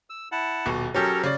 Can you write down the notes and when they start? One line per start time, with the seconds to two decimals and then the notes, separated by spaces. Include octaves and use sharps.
0.10 E6
0.32 E4 F#5 A5
0.66 D#1 B2
0.94 F#3 C#4 G4 A4 A#4
1.23 C#3 D5